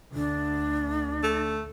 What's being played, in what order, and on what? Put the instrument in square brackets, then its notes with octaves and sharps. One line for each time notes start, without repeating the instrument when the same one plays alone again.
[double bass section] D2 [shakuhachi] D4
[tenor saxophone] A3